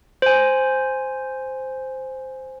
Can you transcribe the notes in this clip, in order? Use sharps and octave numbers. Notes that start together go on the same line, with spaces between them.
C5 G#5